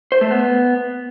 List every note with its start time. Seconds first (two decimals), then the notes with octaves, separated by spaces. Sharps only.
0.12 C5
0.21 A3
0.31 B3